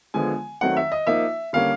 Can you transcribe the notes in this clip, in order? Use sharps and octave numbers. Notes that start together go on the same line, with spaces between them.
D3 F3 G#3 B3 G#5
D#3 F#3 A3 C4 D#4 F#5
E5
D#5
F3 A#3 D#4 E5
D3 G3 A#3 C#4 F5